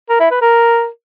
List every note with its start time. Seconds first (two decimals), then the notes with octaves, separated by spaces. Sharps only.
0.09 A#4
0.20 E4
0.31 B4
0.41 A#4